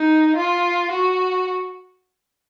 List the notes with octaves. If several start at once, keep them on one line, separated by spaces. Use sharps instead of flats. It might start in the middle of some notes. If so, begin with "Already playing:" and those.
Already playing: D#4
F4
F#4